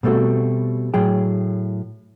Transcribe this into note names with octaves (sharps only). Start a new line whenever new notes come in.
B2 G3 A3 C4 F#4
A2 F#3 G#4 G5